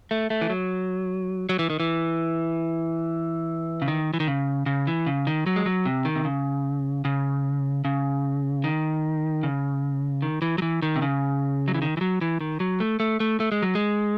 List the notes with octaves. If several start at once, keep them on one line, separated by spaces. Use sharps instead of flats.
A3
A3
E3
F#3
F#3
E3
D#3
E3
C#3
D#3
E3
D#3
C#3
C#3
E3
C#3
D#3
F#3
G#3
F#3
C3
D#3
C3
C#3
C#3
C#3
D#3
C#3
D#3
E3
F#3
E3
D#3
C3
C#3
F#3
E3
D#3
E3
F#3
E3
D#3
F#3
A3
A3
A3
A3
G#3
F#3
G#3